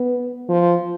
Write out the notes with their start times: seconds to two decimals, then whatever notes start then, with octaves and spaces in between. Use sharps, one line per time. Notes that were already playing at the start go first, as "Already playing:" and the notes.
Already playing: B3
0.49 F3